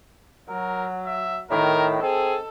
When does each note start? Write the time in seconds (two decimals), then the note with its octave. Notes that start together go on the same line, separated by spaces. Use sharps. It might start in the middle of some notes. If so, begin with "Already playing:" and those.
0.49 F#3 A#4
1.06 E5
1.51 A2 D#3 A#4
2.03 C4 G#4 A4